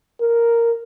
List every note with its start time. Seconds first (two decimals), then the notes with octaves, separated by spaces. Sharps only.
0.21 A#4